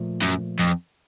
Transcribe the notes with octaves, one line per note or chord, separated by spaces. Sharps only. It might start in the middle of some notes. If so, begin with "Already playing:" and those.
Already playing: A#2 F3 A3
F#2
F2